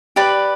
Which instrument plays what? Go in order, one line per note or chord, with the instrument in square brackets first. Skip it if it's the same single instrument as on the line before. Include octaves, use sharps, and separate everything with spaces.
[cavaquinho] G4 B4 D5